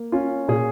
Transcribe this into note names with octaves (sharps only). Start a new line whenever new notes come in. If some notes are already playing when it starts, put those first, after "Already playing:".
Already playing: A#3
C#4 F4
A#2 G#4